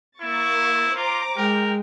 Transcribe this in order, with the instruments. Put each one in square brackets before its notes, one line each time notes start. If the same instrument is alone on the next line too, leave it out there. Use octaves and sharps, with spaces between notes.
[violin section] A#3 C#6 A6 [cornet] E4
[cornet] F4 [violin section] C5 A#5 D6
[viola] G#3 [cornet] A#4 [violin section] G5